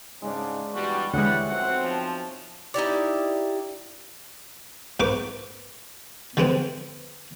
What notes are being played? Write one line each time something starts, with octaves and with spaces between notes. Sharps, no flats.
G#2 C#3 G#3 D4
E2 G2 G3 F#4
D2 E3 G3 G#3 C#5 E5 F#5
B1 F3 C4 F#5
F3 A5
D#4 E4 G4 D5
G#2 A#3 B4 C#6 D6
D3 G#3 B3 C4